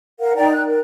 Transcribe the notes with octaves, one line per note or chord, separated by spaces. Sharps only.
A#4 F5 F#5
D#4 D5 G5 A#5
F#6
A#4